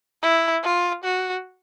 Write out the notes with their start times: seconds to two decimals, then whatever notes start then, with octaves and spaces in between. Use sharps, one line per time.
0.22 E4
0.64 F4
1.04 F#4